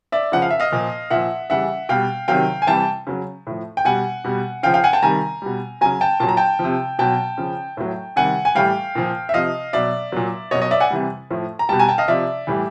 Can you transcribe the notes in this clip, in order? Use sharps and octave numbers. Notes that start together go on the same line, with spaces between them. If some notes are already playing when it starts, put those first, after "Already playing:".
D5 E5
C#3 F3 F#5
F5
E5
D#5 F5
A#2 F3
A#2 F3 E5 F#5
C#3 E3 G3 E5 F#5
B2 G3 F5 G5
C3 D#3 F#3 F5 G5
G#5
C3 E3 G3 G5 A5
C#3 F#3
A2 F3
G5
B2 G3 F#5 G#5
B2 G3
C#3 F3 F5 G5
F5 G5
F#5 G#5
G5 A5
C3 D#3 G3 G#5 A#5
B2 G3
C#3 F#3 G#5 A#5
G5 A5
A#2 F#3 A5
A#5
G5 A5
C3 F3
B2 F#3 G5 A5
C#3 F3
A2 F#3
C3 D#3 G3 F#5 G#5
G#5
A2 E3 G3 F5 G5
A#2 F3
E5
C3 F3 D#5 F5
B2 F#3 D5 E5
A#2 F#3
B2 F#3 C#5 D#5
C#5 D#5
D5 E5
F#5 G#5
C3 E3 G3
A2 F3
A#5
B2 G3 G5 A5
G#5 A#5
G5 A5
D#5 F5
C3 F3 D5 E5
A2 E3 G3